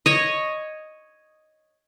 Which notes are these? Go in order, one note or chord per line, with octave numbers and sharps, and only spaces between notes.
C#5 D#5